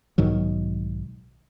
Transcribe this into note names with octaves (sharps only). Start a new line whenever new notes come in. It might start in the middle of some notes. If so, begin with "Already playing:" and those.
B1 G#2 D#3 F#3